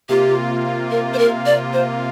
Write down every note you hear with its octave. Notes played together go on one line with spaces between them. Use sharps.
C3 A#3 F4 G4
A#4
C5
A#4
D5
C5